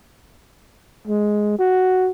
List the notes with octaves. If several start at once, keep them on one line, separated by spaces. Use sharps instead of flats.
G#3
F#4